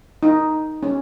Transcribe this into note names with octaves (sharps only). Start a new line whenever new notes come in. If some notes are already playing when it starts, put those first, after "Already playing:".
D#4
C#4